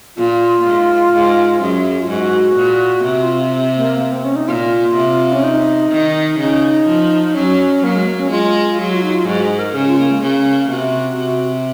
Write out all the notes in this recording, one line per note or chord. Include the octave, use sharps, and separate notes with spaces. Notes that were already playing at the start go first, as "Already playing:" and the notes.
A#2 F4
G#2
G#2
F#2 G#4
F4
G#2 F#4
A#2
C3 F#4
F4
A#3
A#3
C4
C#4
D#4
A#2 F4
C3
C#4
D#4
D#3
C#3 D#4
F3
F#3 C#4
F#3 A#3
G#3
A#3
C#4
G#3 F4
F#3 G#4
F4
D#4
F4
G#2 F#4
G#4
A#4
C#3 G#4
F4
A#3
G#3
C#3 A#3
C3 F#4
C3